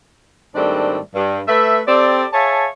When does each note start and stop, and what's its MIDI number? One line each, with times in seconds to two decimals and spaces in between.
0.55 0.98 44
0.55 0.98 51
0.55 0.98 55
0.55 0.98 57
0.55 0.98 60
0.55 0.98 62
1.15 1.41 43
1.48 1.80 57
1.48 1.80 71
1.48 1.80 76
1.88 2.25 60
1.88 2.25 67
1.88 2.25 69
1.88 2.25 74
2.33 2.66 68
2.33 2.66 73
2.33 2.66 76
2.33 2.66 77
2.33 2.66 81